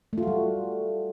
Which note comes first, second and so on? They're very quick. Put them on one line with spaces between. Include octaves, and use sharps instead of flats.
A3 F4 F#4 G3